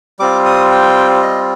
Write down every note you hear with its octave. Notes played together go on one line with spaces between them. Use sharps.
G3 C4 F4 D6
D#6
G5
D#5